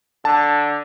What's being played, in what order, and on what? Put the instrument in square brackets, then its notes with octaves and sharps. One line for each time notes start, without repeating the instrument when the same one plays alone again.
[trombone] D3 [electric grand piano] A5